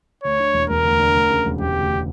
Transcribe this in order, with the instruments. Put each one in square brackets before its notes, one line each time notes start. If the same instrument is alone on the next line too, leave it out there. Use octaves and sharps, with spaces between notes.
[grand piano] D2 [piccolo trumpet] C#5
[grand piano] D3
E1
[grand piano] E1 [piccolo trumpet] A#4
[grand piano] D2
D3
D2
C#3
E1
[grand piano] E1 [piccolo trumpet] G4
[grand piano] D2
C#3